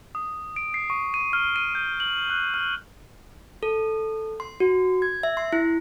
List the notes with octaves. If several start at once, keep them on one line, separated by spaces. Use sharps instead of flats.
D#6
D7
C7
C#6
D#7
F6
D#7
G6
F#7
F#6
F6
A4
C6
F#4
G#6
E5
C6
E4